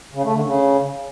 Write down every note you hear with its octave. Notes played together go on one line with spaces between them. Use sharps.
C#3
A3
D3
C#3